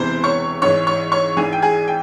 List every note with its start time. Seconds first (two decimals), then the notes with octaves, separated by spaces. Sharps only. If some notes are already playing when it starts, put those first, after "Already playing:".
Already playing: E1 E2 C3 E3 C5 C6
0.24 C#5 C#6
0.62 G#1 G#2 E3 C#5 C#6
0.87 C#5 C#6
1.12 C#5 C#6
1.37 G#1 G#2 E3 G#4 G#5
1.53 G5
1.62 G#4 G#5
1.88 G5